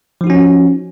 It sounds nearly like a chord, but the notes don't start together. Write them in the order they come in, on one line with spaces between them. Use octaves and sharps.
F3 D#4 F#4 C#4